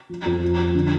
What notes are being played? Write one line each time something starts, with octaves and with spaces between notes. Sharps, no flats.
F3
F2
F3
F3
D3